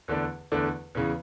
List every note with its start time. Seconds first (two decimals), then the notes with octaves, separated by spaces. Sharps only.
0.08 E2 D3 A3 D4
0.52 E2 D3 A3 D4
0.95 E2 C#3 E3